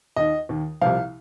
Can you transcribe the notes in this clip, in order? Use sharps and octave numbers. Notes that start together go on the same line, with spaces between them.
D#2 D#3 D#5
D#2 D#3
C2 C3 F3 F5